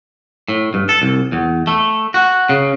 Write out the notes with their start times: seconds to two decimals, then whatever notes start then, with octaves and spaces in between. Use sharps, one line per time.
0.48 A2
0.74 G2
0.89 A4
1.02 C2
1.32 E2
1.67 A3
2.14 F#4
2.49 C#3